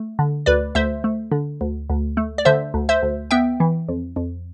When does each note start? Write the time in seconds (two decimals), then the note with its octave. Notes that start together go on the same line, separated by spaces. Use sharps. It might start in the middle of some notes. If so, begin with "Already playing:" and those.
Already playing: A3
0.19 D3
0.46 D2 B4 D5
0.75 D2 C5 E5
1.04 A3
1.32 D3
1.61 D2
1.90 D2
2.17 A3
2.38 D5
2.45 D3 C5 E5
2.74 D2
2.89 C5 E5
3.02 D2
3.31 B3 E5 G5
3.60 E3
3.89 F2
4.16 F2